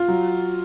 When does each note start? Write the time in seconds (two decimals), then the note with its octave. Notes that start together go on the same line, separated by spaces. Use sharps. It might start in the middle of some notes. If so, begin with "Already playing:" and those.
Already playing: F4
0.08 F#3